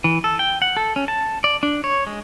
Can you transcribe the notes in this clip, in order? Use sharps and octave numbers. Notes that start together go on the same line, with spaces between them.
E3
A4
G5
F#5
A4
C#4
A5
D5
D4
C#5
G#3